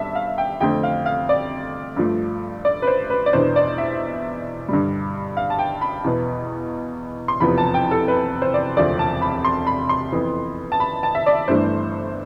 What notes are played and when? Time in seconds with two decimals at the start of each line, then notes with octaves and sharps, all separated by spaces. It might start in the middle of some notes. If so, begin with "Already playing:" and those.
Already playing: G1 G2 E5 A5
0.15 F5
0.38 G5
0.60 F2 D3 A3 C4 G5
0.83 F5
1.06 F5
1.29 D5
1.96 G2 F3 A3
2.65 D5
2.82 B4
2.87 C5
3.10 B4
3.26 D5
3.33 E2 B2 B3 D4 C5
3.56 D5
3.78 E5
4.69 G2 D3 G3
5.37 F5
5.50 A5
5.59 G5
5.81 B5
6.04 E2 B2 B3
7.28 C6
7.40 F1 E2 C3 F3 B3 B5
7.58 A5
7.74 G5
7.91 A4
8.08 B4
8.42 C5
8.54 D5
8.77 E1 D2 C3 F3 C4 D5
8.99 A5
9.22 B5
9.45 C6
9.67 B5
9.89 C6
10.12 F2 E3 B3
10.72 A5
10.80 B5
11.03 A5
11.15 E5
11.26 D5
11.48 G1 G2 E3 A3 D4 C5